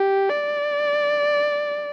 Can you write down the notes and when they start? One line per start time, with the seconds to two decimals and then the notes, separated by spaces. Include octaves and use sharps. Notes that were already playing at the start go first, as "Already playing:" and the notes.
Already playing: G4
0.29 D5